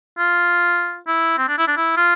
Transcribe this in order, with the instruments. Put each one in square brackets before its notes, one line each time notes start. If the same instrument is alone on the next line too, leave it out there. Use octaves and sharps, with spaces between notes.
[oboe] F4
E4
C4
D4
E4
D4
E4
F4